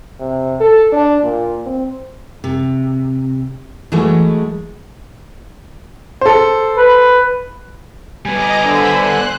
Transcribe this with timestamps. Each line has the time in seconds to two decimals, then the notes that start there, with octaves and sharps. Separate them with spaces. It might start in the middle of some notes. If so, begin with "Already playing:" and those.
0.20 C3
0.60 A4
0.92 D4
1.23 A#2
1.66 C4
2.44 C3
3.92 E3 F#3 G#3 A3
6.21 A4 C5
6.77 B4
8.25 G3 B3 D#5 G#5 A#5 D6
8.61 D3 C5 E5 B5
8.94 C5 F#6